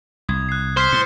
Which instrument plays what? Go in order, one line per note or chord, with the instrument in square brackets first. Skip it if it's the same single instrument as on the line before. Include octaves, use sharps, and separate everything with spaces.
[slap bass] C2 [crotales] D#6 G#6
[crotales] F#6 C7
[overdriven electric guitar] C5 [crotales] F6 B6 C7
[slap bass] A2 [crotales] C#7